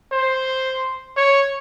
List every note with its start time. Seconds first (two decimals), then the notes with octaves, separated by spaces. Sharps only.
0.12 C5
1.17 C#5